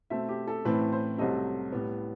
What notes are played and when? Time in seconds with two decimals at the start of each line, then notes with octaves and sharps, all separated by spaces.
0.10 B2 A3 C4 E5
0.29 G4
0.47 A4
0.65 A2 E3 A3 C4 B4
0.92 C5
1.18 C2 C3 F#3 A3 C4 D#5
1.72 A2 G3 B3